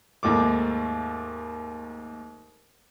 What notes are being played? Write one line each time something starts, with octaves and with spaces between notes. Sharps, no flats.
D#2 G#2 A3 D6